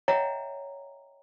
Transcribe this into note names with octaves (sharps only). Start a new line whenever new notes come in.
C#5 D#5 E5 F#5 G5 A#5